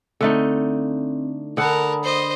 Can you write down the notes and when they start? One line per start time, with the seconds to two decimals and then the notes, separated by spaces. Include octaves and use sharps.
0.21 D3 A3 C4 D#4
1.57 D3 A#4 F#5 A5 B5 D#6
2.04 C5 D#5